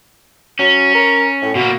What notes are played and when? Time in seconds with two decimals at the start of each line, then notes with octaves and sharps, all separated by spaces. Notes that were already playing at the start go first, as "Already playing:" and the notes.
0.59 F#3 C#4
0.94 A#4
1.42 A2
1.55 B2 A#3 F#4